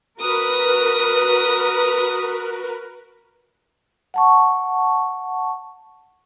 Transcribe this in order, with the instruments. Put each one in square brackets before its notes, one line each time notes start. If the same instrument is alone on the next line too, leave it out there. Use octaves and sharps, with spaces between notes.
[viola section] F#4 A#4 B4 [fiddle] D#6
[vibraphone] F#5 A5 C#6